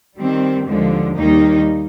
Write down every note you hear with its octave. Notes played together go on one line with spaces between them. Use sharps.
D#3 G3 C4
D#2 D3 F3 G#3
D#2 D#3 G3 A#3 D#4